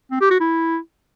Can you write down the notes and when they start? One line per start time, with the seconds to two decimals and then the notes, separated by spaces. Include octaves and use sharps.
0.11 C4
0.21 G4
0.31 F#4
0.40 E4